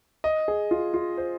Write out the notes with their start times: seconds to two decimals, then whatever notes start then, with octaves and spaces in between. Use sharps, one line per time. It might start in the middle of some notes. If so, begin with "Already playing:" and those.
0.24 D#5
0.48 G#4
0.71 F4
0.94 F4
1.18 C5